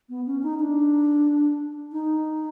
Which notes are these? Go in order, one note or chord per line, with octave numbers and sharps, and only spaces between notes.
B3
C#4
D#4
D4
D#4